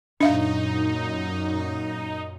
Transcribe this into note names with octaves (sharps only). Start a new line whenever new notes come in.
F#2 A#2 D4 D#4 E5 F5